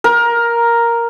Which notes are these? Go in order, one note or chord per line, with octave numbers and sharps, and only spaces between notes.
A#4